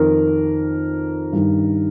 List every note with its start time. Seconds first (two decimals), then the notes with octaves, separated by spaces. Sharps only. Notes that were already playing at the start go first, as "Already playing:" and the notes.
Already playing: F2 D#3 A#4
1.33 G2 D#3